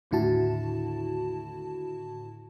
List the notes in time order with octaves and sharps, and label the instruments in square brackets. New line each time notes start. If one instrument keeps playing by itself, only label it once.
[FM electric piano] D#2 A2 D3 E4 F#4 A5